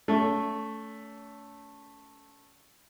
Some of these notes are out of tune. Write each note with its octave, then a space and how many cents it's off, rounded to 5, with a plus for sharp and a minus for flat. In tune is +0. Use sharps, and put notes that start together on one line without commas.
A3 +0 C#4 +35